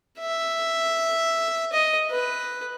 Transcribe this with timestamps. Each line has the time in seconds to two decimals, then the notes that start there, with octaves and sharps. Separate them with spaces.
0.19 E5
1.73 D#5
2.11 B4